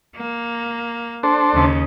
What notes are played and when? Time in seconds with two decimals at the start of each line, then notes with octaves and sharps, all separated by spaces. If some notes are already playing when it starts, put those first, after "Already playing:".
0.16 A#3
1.23 D4 A4 C5
1.54 D#2 C#3